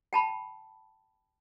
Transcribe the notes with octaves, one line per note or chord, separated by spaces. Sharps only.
G5 A5 B5